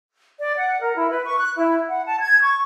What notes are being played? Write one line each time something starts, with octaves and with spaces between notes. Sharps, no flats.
D5
F#5
A#4
E4
B4
C#6
F#6
E4
F#5
A5
G#6
C#6